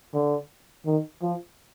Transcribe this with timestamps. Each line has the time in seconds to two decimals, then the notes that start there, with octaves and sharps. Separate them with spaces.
0.14 D3
0.86 D#3
1.22 F3